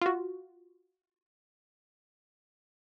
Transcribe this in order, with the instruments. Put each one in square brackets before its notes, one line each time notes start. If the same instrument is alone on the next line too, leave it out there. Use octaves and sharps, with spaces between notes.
[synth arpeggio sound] F4 F#4